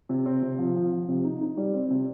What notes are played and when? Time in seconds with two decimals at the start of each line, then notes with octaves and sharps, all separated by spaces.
0.09 C3
0.26 C4
0.42 C3
0.58 F3
0.76 F3
0.92 F3
1.08 C3
1.24 D#4
1.41 D#4
1.57 G3
1.74 C4
1.90 C3